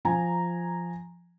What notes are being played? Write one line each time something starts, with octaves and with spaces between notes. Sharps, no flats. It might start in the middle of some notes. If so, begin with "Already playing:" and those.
F3 G#5 A#5